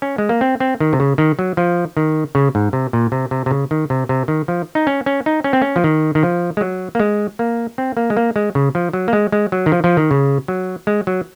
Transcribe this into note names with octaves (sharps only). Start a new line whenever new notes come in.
C#4
G#3
A#3
C4
C4
D#3
C3
C#3
D#3
F#3
F3
D#3
C#3
G#2
C3
A#2
C3
C3
C3
C#3
D#3
C3
C3
D#3
F3
D#4
C#4
C#4
D#4
C#4
C4
C#4
F3
D#3
D#3
F3
G#3
F#3
A#3
G#3
A#3
C4
A#3
G#3
A#3
G#3
C#3
F3
F#3
A#3
G#3
G#3
F#3
D#3
F3
F3
D#3
C#3
F#3
G#3
F#3